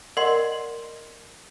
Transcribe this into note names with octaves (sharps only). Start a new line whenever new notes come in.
A#4 D5 D#5 F#5 C6